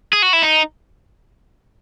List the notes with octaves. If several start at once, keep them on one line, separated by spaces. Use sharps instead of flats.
G#4
F#4
E4
D#4